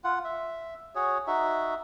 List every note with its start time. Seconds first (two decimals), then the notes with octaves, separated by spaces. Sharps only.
0.04 F4 F#5
0.25 E5
0.95 F#4 G#4 C#5
1.27 D#4 F#4 E5